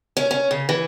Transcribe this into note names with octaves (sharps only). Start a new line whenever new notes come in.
C#4
C#4
C#3
E3